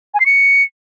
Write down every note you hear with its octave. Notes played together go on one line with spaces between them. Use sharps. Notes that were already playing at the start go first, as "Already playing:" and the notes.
G#5
C7
C#7